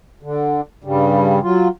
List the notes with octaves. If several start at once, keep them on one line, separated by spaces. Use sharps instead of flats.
D3
G2 C#3 G3
F#3 F4